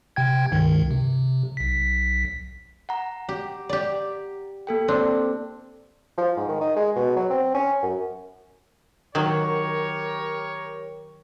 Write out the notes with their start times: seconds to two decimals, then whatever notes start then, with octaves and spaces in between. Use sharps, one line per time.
0.16 C3 G5 G#6
0.52 C#2 G2 D#3
0.91 C3
1.57 B1 B6
2.89 F#5 A#5
3.29 G4
3.69 G4 D5
4.67 A#3 A4 G5
4.88 C4 D4
6.18 F3
6.37 G#2
6.49 D#3
6.61 D#4
6.76 G#3
6.96 B2
7.17 F#3
7.30 C4
7.54 C#4
7.83 F#2
9.15 D#3 F#3 G4 A#4 C#5